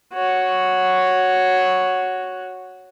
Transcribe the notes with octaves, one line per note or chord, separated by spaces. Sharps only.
F#4 C#5